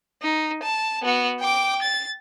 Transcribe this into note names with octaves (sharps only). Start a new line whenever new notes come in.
D#4
A5
B3 F#4
G5 D6
A6